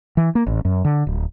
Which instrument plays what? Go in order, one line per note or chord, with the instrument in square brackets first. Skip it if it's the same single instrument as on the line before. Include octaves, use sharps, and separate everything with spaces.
[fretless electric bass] E3
A#3
A1
F#2
D3
D1